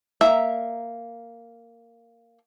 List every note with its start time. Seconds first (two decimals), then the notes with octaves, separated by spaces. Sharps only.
0.21 A#3 E5 A#5